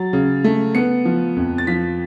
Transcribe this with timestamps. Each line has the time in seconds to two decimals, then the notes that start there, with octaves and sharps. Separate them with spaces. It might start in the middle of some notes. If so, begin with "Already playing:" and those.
Already playing: F#3 A6
0.13 C#3
0.44 A3
0.75 B3 C#7
1.05 F3
1.36 F2
1.58 A6
1.67 F3 B6